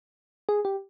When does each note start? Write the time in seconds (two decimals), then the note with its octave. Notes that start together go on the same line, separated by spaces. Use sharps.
0.49 G#4
0.65 G4